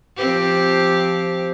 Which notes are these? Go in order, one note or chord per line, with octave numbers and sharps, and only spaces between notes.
F3 C4 G4